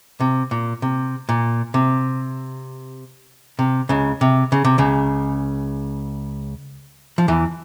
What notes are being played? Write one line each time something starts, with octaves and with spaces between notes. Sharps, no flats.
C3
A#2
C3
A#2
C3
C3
C#2 C#3
C3
C#3
C3
C#2 C#3
F3
E2 E3